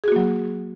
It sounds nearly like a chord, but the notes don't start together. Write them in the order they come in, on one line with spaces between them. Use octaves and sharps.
G#4 F#4 A#3 F#3